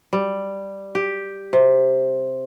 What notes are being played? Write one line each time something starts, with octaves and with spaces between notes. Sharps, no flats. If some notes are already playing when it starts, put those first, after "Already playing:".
G3
G4
C3